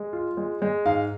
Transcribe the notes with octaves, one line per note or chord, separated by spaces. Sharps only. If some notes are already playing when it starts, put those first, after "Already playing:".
Already playing: G#3
F4
G#3
G#3
G#2 F5